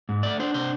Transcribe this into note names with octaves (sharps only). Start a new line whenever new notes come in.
G#2
A3 D5
D4 C5
C3 C5